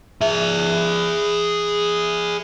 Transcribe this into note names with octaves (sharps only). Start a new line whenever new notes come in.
G#4 E5